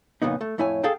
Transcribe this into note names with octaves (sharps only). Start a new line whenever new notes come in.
F2 A#2 C#3 B3 D#4
A3
F2 A2 E4 C#5 G#5
G#4 A4 F5 G5